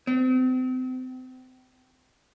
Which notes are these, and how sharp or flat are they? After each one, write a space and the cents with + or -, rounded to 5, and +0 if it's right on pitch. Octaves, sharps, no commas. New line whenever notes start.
C4 -35